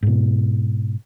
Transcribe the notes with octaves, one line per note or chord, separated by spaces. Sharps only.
G#2 B2